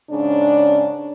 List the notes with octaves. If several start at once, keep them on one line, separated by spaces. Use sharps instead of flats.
G#2 C#3 C#4 D4